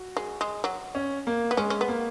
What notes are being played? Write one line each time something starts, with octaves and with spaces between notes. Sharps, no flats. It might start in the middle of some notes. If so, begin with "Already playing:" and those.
Already playing: F#4
G#3
G#3
F#3
C#4
A#3
B3
G#3 C#4
C#4
B3
A#3